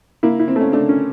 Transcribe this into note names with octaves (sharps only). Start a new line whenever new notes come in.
A#3 E4
E4
C4
A3 C#4
A3 D4
C#4